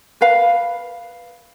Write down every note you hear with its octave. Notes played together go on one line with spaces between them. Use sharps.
A#4 B4 F5 B5